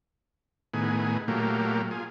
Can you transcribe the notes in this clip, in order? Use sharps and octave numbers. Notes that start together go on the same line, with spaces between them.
A2 D#3 B3 G#4
A#2 F#3 A3 A#3 G4
F4 G#4